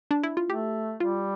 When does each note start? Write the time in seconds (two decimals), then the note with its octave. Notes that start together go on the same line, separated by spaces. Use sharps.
0.11 D4
0.24 E4
0.37 F4
0.50 A3 G4
1.00 G3 F4